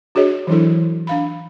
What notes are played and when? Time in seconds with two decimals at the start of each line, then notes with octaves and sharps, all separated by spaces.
0.15 D4 F#4 G#4 C#5 D#5
0.47 E3 F#3 D4 E4 A4
1.07 D4 F5 B5